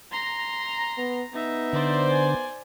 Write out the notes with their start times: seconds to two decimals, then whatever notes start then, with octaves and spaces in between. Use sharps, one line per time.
0.12 A#5 C6
0.97 B3
1.33 B3 D#4 E5
1.73 D3 C5 D5
2.11 G#5